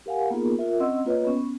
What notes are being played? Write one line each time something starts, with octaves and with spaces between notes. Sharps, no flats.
G4 A#4 F5 F#5 G#5
A#3 B3 D#4 F4 G#4 A#4
F4 A#4 E5
C4 C#4 D#5 F#5 C6 E6
A#3 F4 B4 C#5 D#5
B3 C#4